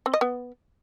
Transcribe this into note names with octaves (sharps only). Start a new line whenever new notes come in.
C4
D#5
B3